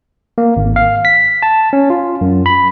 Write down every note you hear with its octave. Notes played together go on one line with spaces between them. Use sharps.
A#3
G#1
F5
B6
A5
C#4
F4
F#2
B5